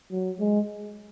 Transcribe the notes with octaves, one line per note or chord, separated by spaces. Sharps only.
F#3
G#3